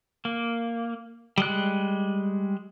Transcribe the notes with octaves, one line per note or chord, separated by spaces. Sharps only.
A#3
G3 G#3 F#6